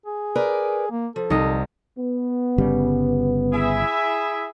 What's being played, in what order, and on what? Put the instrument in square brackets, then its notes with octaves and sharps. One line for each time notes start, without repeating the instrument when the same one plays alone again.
[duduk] G#4
[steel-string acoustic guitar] A#4 B4 D5
[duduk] A#3
[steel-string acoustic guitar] F3 [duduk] A4
[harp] C2 D#4 D#5
[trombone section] B3
[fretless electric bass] G1 C#3 G3
[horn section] E4 G#4 E5